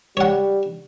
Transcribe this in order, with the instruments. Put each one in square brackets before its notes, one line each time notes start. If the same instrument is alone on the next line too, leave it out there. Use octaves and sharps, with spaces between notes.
[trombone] G3 [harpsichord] C#5 F#5